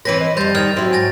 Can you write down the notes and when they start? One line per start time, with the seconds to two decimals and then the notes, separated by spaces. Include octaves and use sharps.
0.05 E3 C4 B4 C#5 A#6 B6 D#7
0.20 D#5
0.37 F2 G3 C5 B5 G6 A6
0.55 D#3 F6 G#6 F7
0.76 F#3 C4 E4
0.93 G#2 G#5 A6 A#6